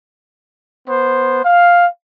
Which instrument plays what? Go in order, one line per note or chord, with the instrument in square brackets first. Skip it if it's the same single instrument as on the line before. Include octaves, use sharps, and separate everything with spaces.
[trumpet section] B3 C5
F5